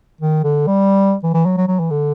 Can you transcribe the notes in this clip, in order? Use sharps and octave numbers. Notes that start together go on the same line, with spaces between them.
D#3
D3
G3
E3
E3
F#3
F#3
F#3
E3
D3